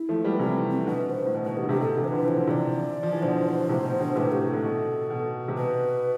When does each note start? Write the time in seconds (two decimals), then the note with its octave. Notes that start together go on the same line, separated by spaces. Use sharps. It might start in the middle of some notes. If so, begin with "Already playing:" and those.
Already playing: E4
0.09 F3 A3
0.24 G3 B3
0.39 C3 E3 C4
0.71 C4
0.87 B2 D3 B4
1.10 C5
1.25 A2
1.34 B2
1.45 B2 B4
1.57 B2 G4
1.63 D3
1.69 A2 C3 G4
1.80 B2 D3 A4
1.97 C3 E3
2.04 C5
2.08 D3 F3 B4
2.28 E3 C5
2.38 D3
2.47 C3 E3 D5
3.03 F3
3.12 E3
3.22 B2 D3 C5
3.69 A2 C3
3.85 B2
4.00 B2 D3
4.16 A2 C3 B4
4.32 G4
4.48 A4
4.53 A2
4.63 B2
5.10 B2
5.48 C3
5.57 B2 B4